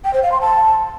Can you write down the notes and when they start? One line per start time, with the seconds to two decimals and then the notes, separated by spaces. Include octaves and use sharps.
0.04 G5
0.14 C5
0.23 F5
0.32 C6
0.41 A5